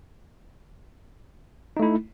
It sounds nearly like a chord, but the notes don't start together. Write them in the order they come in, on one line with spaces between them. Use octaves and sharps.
D#4 A3 E4